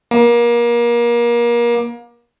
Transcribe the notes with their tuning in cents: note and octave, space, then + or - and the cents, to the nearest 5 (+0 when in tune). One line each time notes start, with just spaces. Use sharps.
A#3 +30